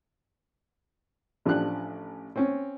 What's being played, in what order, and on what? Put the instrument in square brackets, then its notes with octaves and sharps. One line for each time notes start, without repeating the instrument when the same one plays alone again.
[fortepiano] A1 F3 D4 G4 F#6
C4 C#4